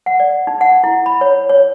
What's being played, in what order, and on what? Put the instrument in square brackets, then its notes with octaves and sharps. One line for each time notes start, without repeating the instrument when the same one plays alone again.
[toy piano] F#5
D5
D#4
F#5
E4
B5
C#5
C#5